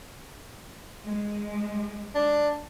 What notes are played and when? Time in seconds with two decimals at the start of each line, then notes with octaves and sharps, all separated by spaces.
1.05 G#3
2.15 D4